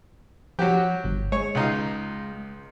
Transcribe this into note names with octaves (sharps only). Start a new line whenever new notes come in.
F3 F#3 F#4 G4
G1
G#3 C#5
C#2 D#4 F4